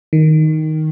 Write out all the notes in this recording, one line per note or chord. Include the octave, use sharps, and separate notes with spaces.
D#3